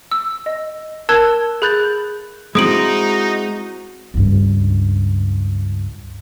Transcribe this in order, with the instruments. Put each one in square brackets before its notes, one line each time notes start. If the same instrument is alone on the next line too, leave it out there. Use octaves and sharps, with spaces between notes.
[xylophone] E6
D#5
A#4 A5 E6 F#6 G#6
G#4 B5 F#6 G6 A6
[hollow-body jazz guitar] G#3 C4 E4 [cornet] D#4 [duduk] F#4 [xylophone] D#6 D7 F#7
[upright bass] C#2 G2